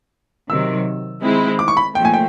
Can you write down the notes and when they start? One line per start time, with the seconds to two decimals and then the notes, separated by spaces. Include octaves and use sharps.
0.49 C3 D#3 F#3 E6
1.23 D#3 G#3 C4 E4
1.59 D6
1.68 C#6
1.77 B5
1.95 A#2 F3 A3 G5
2.05 G#5
2.14 G5